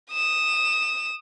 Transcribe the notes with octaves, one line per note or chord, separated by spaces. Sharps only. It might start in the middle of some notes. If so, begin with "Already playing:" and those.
D#6 E7